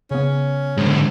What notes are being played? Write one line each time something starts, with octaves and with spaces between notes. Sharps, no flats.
C#3 B3 C#4
G#2 D3